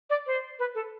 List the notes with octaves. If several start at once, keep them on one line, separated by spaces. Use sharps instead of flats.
D5
C5
B4
A4